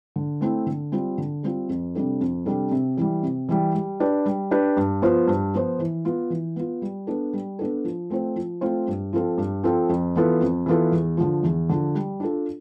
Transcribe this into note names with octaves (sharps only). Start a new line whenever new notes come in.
D3
A3 C4 E4
D3
G3 C4 F4
D3
G3 C4 F4
F2
C3 G3 D4 A4
F2
C3 G3 D4 A4
C3
E3 G3
C3
E3 G3
G3
D4 G4 B4 D5
G3
D4 G4 B4 D5
G2
F3 B3 F4 C5
G2
F3 B3 F4 C5
E3
B3 F4
E3
B3 F4
G3
B3 D4 A4
G3
B3 D4 A4
F3
A3 C4 F4 C5
F3
A3 C4 F4 C5
G2
F3 C4 F4 A4
G2
F3 C4 F4 A4
F2
E3 B3 F4 A4
F2
E3 B3 F4 A4
E2
D3 F3
E2
D3 F3
G3
D4 F4 A4